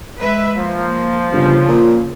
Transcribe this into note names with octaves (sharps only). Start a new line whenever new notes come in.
G#3 B4 E5
F3 A#3
G1 C#3 F4
A#2